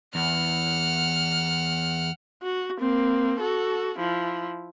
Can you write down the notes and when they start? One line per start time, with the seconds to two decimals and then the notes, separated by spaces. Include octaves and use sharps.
0.15 E2 F#5 F6
2.42 F#4
2.80 A#3 C4
3.40 F#4 A4
3.98 F3 E4